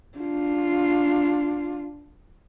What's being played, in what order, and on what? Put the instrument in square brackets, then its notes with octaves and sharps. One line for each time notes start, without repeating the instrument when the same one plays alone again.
[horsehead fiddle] D4 F4